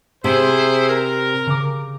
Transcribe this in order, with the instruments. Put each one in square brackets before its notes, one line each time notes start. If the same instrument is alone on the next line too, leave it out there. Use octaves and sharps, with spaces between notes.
[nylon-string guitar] C3 [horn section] E4 G#4 C5
[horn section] A#4
[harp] C#3 D6